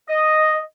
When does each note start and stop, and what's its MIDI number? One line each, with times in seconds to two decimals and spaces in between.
0.09 0.60 75